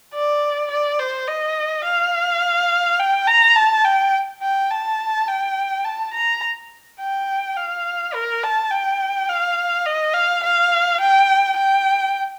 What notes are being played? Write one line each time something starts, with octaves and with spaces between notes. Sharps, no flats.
D5
D5
C5
D#5
F5
G5
A#5
A5
G5
G5
A5
G5
A5
A#5
G5
F5
A#4
A5
G5
F5
D#5
F5
F5
G5
G5